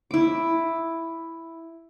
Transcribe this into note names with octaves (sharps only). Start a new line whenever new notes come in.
E4 D6